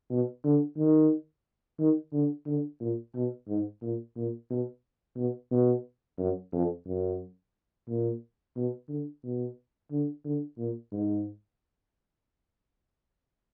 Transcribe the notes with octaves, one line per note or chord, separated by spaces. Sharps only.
B2
D3
D#3
D#3
D3
D3
A#2
B2
G#2
A#2
A#2
B2
B2
B2
F#2
F2
F#2
A#2
B2
D3
B2
D3
D3
A#2
G#2